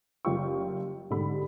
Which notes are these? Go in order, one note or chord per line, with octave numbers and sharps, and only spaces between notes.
F#1 G3 F4 G5 C#6
G#2 D3 G3 B5